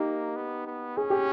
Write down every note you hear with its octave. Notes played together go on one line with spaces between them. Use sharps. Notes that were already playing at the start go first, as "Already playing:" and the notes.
Already playing: A#3 D#4 G4
B3
B3
C#4 G#4
G4